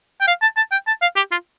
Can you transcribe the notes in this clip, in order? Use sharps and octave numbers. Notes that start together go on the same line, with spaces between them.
G5
F5
A5
A5
G5
A5
F5
G4
F4